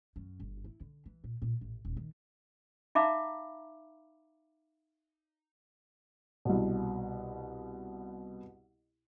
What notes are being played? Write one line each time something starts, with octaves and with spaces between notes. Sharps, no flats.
F#2
G1
E4
D3
E3
A#2
A#2
A1
D#1
D#3
D#4 E5 F5 A#5 B5 D6
C2 B2